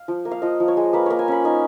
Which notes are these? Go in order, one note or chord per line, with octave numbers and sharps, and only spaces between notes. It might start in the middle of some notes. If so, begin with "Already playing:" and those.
Already playing: F5
F3
A#3
F5
F3 D#5
F3
C#5
G#3
A#3 B4
A#3 C#5
G#5
C#4 B5
D#4 G#5